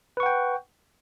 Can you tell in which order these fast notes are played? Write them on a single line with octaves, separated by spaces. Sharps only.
B4 C#6 F#5 G5